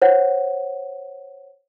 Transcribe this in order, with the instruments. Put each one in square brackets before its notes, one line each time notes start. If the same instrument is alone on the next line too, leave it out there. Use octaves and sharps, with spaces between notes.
[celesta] C5 C#5 F#5